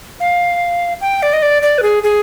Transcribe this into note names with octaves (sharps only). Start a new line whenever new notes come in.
F5
G5
D5
D#5
D5
D5
B4
G#4
G#4